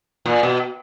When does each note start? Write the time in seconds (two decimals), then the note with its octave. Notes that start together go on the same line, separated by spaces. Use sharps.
0.26 A#2
0.43 B2